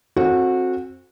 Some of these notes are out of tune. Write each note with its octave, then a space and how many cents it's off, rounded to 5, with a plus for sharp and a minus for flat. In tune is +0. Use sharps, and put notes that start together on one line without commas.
C4 +20 F#4 -20 A4 +0